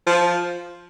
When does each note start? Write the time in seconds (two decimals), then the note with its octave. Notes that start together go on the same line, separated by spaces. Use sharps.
0.07 F3